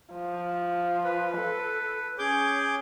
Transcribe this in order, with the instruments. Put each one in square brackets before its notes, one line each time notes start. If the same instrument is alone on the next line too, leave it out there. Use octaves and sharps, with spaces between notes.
[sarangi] F3
[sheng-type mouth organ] B4
[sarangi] A4
[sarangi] C#4 [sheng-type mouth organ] G#4 D6 G6